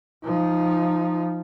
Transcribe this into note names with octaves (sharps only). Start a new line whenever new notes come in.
F3 D#4